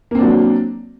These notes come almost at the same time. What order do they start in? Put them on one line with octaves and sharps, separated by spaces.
A#3 C4 D4 F#3